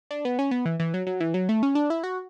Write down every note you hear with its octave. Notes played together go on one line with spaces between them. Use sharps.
D4
B3
C#4
B3
E3
E3
F#3
F#3
E3
F#3
A3
C#4
D4
E4
F#4